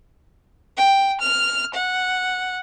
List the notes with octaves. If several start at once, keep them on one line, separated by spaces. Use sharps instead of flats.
G5
F6
F#5